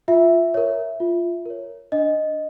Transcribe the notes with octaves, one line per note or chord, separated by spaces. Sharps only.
F4 E5
A#4 C#5
F4
A#4 C#5
D4 D#5